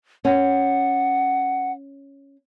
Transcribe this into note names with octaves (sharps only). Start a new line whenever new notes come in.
C#4 F#5